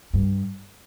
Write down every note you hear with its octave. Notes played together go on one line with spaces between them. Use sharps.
G2